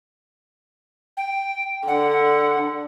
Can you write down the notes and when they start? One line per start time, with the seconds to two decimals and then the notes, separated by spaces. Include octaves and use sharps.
1.17 G5
1.88 D3 F#5